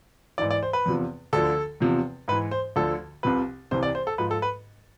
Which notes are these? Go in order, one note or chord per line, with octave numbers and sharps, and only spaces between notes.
G#2 E3 D5
D5
C5
B4
E2 C3 F3
D2 D3 F3 A4
E2 C3 F3
G#2 E3 B4
C5
D2 D3 F3 A4
C2 C3 F3 B4
C2 C3 E3 C5
D5
C5
A4
G#2 F3 B4
A4
B4